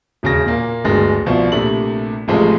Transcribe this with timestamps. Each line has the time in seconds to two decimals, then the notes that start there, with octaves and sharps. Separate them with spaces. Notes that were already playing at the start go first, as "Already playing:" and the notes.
0.23 E1 C#3 A#6
0.46 A#2 A#3
0.84 D1 G1 G#3 A#6
1.26 C2 B2 F3
1.52 A#1 C3 A3 F#7
2.28 A1 A2 C3 F3 G#3 A3